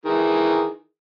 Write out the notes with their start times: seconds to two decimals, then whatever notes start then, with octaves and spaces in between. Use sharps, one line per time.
0.05 D#3 E3 G#4